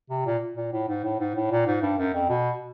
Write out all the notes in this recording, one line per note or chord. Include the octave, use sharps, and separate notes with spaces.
C3
A#2
A#2
A2
G#2
A2
G#2
A2
A#2
G#2
G2
F#2
F2
B2